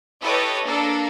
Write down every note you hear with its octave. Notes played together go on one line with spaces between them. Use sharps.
E4 G4 A4 B4 C#5 D#5
A#3 D4 A4